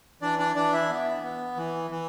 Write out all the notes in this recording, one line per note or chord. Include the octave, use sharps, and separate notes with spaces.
E3 D4 D5
D4 D5
E3 D4 D5
E4 E5
B3
B3
E3
E3